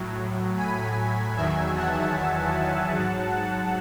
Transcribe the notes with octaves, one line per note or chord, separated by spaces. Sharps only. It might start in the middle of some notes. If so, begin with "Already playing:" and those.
Already playing: A2 F#3
G#5 B5
E2 D#3 F#3 E5 G#5
F#5 A5
G#2 F#3